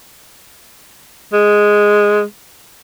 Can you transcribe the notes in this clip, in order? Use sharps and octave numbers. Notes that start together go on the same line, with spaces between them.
G#3